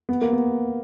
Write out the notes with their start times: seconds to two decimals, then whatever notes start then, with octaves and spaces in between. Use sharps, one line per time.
0.09 B3
0.21 A#3
0.33 B3